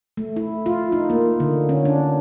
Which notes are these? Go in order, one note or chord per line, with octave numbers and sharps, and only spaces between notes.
A3
E4
F4
D#4
A#3
D3
C#4
D4